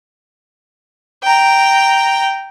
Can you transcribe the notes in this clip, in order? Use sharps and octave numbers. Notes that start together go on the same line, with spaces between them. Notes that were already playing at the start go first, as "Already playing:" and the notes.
G5 A#5